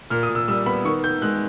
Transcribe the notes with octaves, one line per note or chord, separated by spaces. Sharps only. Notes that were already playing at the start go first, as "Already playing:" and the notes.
A#2 F6
D#6
A#2
E6
G3 E6
B3 B5
D#3 C#6
D#3 G6
G#3 F#6